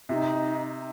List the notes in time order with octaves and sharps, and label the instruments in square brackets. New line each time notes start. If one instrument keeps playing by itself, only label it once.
[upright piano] C3 [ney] F4
[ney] D#4